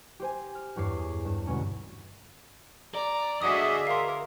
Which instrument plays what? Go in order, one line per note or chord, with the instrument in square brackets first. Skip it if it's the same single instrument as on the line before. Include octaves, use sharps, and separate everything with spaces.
[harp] G4 C5 G#5
F6
E2 G2 C#5 D6 C7
G#4
G2 E7
D2 B2 G#3 C#4
[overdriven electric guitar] D5 [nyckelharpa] A#5
[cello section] D3 G#4 E5 [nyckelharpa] F#4 D#5 [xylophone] D#6
[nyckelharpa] A#4 [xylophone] F5 C6